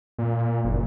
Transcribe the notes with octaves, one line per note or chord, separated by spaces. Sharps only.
A#2
F#1